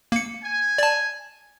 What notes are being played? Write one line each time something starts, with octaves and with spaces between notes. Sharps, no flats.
A#3 C#7
G#5
D5 A5